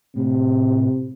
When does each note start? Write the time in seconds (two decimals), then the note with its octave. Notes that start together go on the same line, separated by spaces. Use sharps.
0.15 A2 C3